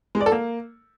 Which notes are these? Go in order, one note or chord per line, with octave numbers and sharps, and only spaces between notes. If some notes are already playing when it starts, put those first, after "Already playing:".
G#3
D5
A4
A#3